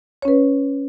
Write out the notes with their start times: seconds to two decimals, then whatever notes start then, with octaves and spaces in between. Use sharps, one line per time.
0.22 C#5
0.25 C#4
0.28 B4